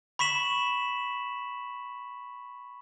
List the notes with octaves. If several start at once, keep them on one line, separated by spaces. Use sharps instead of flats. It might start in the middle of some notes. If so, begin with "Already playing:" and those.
B5 C#6 B6 E7 F#7